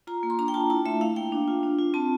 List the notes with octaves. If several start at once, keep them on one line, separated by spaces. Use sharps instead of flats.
F4 A#5
A#3
C6
D4 A#5
G5
F4 A5
E4 A5
A3 E5
E4 F5
A#3 G5
D4
F4
D4
F4
C4 A5